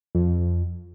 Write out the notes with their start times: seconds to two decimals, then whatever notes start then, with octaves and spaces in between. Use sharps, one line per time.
0.15 F2